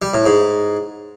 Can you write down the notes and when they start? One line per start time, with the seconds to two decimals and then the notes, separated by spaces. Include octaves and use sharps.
0.02 G3
0.14 A2
0.26 G#2